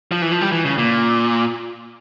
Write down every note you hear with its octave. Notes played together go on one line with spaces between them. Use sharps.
F3
E3
F3
G3
E3
C#3
A#2